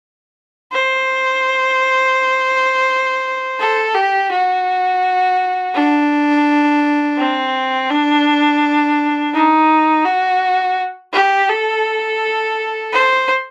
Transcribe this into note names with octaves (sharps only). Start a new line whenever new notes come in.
C5
A4
G4
F#4
D4
C4
D4
D#4
F#4
G4
A4
C5